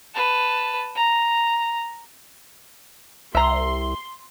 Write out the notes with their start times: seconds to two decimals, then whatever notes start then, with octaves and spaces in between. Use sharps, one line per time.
0.14 B4 A5
0.95 A#5
3.35 C2 E5 A#5 C6